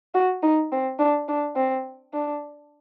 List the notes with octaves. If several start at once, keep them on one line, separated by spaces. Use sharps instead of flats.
F#4
D#4
C4
D4
D4
C4
D4